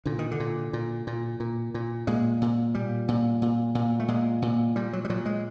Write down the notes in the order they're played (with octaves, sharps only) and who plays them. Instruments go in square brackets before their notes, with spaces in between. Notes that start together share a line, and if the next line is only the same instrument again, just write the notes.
[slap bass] A#2 D3
D#3
D3
A#2
A#2
A#2
A#2
A#2
A#2 G#3
A#2
A#2 G3
A#2
A#2
A#2
A3
A#2 G#3
A#2
A#2 G3
F#3
G3
A#2 F#3
G#3